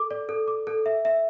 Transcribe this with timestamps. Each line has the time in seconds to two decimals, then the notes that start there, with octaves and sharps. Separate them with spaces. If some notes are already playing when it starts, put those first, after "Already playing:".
Already playing: A4 D6
0.11 D5
0.29 A4
0.48 D6
0.67 A4
0.86 E5
1.05 E5